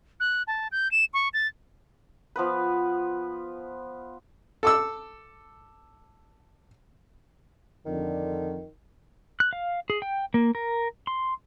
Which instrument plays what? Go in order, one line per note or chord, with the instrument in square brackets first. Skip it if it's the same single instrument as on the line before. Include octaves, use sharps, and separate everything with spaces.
[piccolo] F#6
A5
G6
E7
C#6
A6
[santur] F3 B3 B4
[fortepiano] A4 D6 E6
[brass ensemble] F2 D3 [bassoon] D#3
[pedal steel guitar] F#6
F5
G#4
G5
A#3
A#4
C6